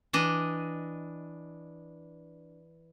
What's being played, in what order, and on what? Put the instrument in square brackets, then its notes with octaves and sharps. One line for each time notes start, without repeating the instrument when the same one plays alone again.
[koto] E3 D4 D#5